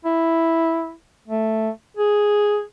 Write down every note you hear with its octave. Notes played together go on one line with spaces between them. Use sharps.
E4
A3
G#4